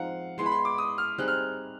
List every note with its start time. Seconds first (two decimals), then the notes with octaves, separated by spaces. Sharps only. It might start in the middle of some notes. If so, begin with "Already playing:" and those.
Already playing: F3 G#3 C4 D#4 F5 F#5
0.38 G#3 B3 E4 G#4 C6
0.46 B5
0.52 C6
0.65 D6
0.78 D#6
0.98 F6
1.18 G3 C4 D#4 G#4 F#6
1.28 F6